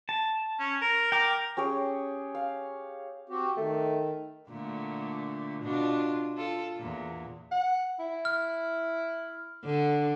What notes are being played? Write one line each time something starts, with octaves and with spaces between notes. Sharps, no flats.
A5
C#4
A#4
A#4 G5 D6
C#4 G4 G#4 C#5
F5
C4 F#4 G4
D#3 A3
A#2 D3 A3
B2 D4 F4
F4 A4
E2 A#2
F#5
E4
F6
D3